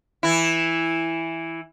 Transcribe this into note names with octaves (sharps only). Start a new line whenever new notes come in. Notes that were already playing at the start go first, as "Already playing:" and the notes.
E3 E4